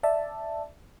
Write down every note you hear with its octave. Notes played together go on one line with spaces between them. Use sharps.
D5 E5 A5